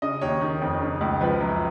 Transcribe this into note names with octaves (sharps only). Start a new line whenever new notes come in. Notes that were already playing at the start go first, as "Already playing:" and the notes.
C#3 D#5
D#2 C#5
D#3
F2
C#3
C#2
F3 B4
F#2